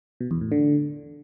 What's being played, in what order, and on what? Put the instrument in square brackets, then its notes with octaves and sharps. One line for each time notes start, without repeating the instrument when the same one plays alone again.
[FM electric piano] B2
E2
A2
D3